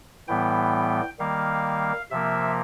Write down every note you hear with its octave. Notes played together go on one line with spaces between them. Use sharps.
A2 E3 G3 B3 G5
D#3 G3 A#3 F5
C3 F3 A#3 E5